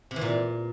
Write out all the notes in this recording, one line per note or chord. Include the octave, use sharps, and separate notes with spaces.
C3
E3
A#2